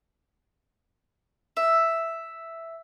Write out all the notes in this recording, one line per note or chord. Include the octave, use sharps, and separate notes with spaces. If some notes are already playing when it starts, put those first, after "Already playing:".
E5